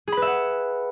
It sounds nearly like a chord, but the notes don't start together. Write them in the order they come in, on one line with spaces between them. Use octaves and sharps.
G#4 B5 B4 E5 F#5